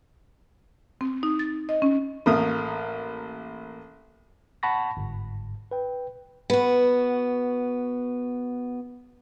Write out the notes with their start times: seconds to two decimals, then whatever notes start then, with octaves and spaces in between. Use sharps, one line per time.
1.01 C4
1.23 D#4
1.39 A6
1.69 D#5
1.82 C#4
2.26 A1 A3 A#3 D#6
4.63 F#5 A5 B5 C#6 A#6
4.97 G1 G#2
5.71 B4 G5
6.50 B3 F#4